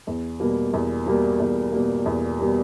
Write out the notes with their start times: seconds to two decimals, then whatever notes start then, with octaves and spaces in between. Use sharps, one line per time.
0.07 E2
0.40 B2 G3 A#3
0.73 E2
1.06 B2 G3 A#3
1.40 E2
1.72 B2 G3 A#3
2.06 E2
2.39 B2 G3 A#3